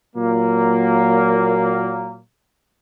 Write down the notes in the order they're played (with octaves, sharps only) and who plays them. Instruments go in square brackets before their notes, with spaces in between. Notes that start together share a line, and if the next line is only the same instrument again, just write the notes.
[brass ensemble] A#2 F#3 A#3